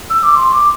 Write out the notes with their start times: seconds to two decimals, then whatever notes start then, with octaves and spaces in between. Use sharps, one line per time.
0.10 E6
0.23 D6
0.36 C6
0.53 D6